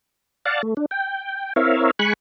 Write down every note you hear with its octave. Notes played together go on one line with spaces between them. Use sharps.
D5 F5 F#5 A5
A3
D4
G5
C4 E4 A#4 C#5 E5 F5
G#3 G#5 B5 C#6 F#6